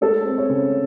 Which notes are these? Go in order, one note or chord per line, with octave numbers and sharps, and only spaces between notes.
G#3 A4
C4
C#5
C#3